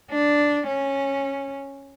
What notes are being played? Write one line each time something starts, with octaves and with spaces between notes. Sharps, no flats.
D4
C#4